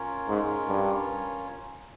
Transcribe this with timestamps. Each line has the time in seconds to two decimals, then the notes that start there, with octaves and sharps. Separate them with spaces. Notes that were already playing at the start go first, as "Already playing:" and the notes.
Already playing: C#4 F4 A#4 C#5
0.28 G#2
0.68 G2